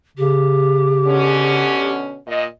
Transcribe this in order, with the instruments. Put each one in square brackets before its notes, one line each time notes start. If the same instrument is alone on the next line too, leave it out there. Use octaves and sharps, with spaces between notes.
[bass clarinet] C#3 [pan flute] G4
[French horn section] B2 D3 C#4
A#2 D#5